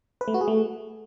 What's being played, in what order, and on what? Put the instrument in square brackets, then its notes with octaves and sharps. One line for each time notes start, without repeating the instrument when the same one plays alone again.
[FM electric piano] B4
A3
F#4
G#4
A3